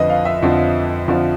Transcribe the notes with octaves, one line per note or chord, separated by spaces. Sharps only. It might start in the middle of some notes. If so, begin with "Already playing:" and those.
Already playing: F2 D3 F3 B4 D#5
F5
E5
F2 D3 F3
F2 D3 F3